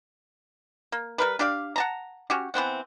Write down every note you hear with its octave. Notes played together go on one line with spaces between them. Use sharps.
A#3
G3 A#4 B4
D4 G4 D5 F5
F#5 A5 A#5
C#4 F#4 G4
E3 B3 C4 F#5